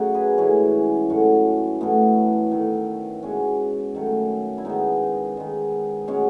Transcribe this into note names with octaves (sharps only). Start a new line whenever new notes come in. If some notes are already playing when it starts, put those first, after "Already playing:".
Already playing: C#3 F#3 A3 D#4 F#4 C#5
G#4 B4
A2 E3 G#3 C#4
A2 F#3 A3
A2 E3 A3 B3
D#3 A3
B2 G#3 C#4
D#3 F#3 A3
E4
D#3 G#3 B3 D#4
D#3 G#3
B2 G#3 C#4